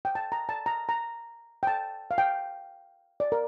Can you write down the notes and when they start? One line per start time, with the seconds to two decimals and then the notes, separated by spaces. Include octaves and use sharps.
0.05 G5
0.15 A5
0.32 A#5
0.49 A5
0.66 A#5
0.89 A#5
1.63 G5
1.67 A5
2.11 F5
2.18 G5
3.20 D5
3.32 A#4